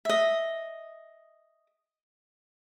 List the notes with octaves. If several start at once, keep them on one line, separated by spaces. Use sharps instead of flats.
D#5 E5